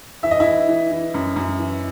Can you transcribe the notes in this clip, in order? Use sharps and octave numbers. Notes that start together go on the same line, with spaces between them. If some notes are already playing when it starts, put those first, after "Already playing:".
E3 E5
D#5
E4 E5
E3
E3
E3
F#2
F#2
E3